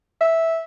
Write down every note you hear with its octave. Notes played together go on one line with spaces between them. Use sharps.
E5